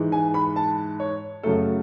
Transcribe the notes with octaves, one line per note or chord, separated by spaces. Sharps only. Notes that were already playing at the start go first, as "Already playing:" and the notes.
Already playing: G#2 E3 G#3
G#5
B5
A5
C#5
F#2 C#3 F#3 A3 A4